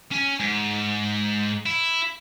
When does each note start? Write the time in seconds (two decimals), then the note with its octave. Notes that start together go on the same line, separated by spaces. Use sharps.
0.12 C#4 G#5
0.40 G#2
1.66 E4